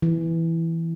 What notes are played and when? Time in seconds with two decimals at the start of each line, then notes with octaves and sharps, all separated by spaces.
0.02 E3